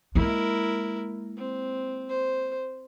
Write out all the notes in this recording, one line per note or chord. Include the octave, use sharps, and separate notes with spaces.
G#3 A#3 E4 A#4
C4
C5